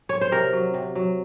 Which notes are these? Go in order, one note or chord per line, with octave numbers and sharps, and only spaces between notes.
C#5
C5
C3 A#4
F#3
C3
F#3